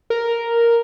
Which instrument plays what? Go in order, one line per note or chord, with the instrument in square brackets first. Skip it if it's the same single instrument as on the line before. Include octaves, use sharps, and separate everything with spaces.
[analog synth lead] A#4